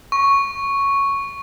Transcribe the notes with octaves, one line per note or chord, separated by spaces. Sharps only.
C#6